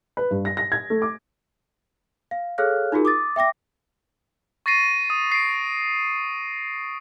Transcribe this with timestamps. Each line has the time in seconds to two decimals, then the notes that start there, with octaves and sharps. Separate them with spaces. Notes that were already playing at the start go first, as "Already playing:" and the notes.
0.17 B4
0.31 G2
0.45 A#6
0.57 A#6
0.72 G#6
0.90 A3
1.02 D6
2.31 F5
2.58 G#4 A4 C#5 F5 F6 F#6
2.92 D#4 F4 F#4 G#4 A#4
3.05 D6 D#6 A6
3.36 E5 G5 D6 A#6
4.66 C#6 A6 A#6 C7 D#7
5.10 D#6
5.32 C7 D7